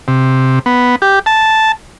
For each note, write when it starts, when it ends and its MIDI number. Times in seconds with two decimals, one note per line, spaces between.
0.08 0.59 48
0.66 0.96 59
1.02 1.19 67
1.26 1.72 81